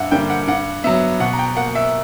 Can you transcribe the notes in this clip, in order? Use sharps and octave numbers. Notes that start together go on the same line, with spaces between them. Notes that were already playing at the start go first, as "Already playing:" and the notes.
Already playing: G2 E5 F#5
D3 G3 A#3 G5
F#5
G2 F#5
F#3 B3 E5
B2 F#5
A#5
G5
A#3 F#5
E5